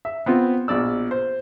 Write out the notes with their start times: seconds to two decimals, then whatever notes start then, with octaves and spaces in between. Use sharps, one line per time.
0.05 E5
0.26 B3 C4 F4
0.68 A#1 B2 D5 E6
1.11 C5